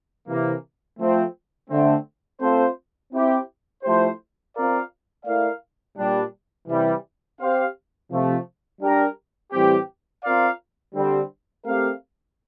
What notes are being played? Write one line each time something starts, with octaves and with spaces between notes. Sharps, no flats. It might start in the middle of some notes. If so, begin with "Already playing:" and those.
C3 E3 A#3
F3 A3 C4
D3 A3 C4
A3 C4 F4 A4 C5
C4 E4 G4
F3 A3 E4 G4 C5
C4 F4 A#4 D5 F5
A3 E4 A#4 D5 F5
A#2 G3 D4
C3 E3 G3
C4 G4 C5 F5
C3 F3 A3
G3 D4 G4 A#4
A2 E3 G3 C4 G4
C4 F4 A#4 D5 F5
D3 G3 C4
A3 C4 G4 A#4 F5